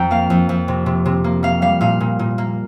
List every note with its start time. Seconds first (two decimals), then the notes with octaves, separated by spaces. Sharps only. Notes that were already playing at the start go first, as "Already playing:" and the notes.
Already playing: F2 G5 A#5
0.11 A#3 F5
0.30 F2
0.49 F2
0.68 C3
0.86 C3
1.06 C3
1.24 A#3
1.43 A#3 F5
1.62 G3 F5
1.81 A#2 F5
2.00 A#2
2.19 A#2
2.38 A#3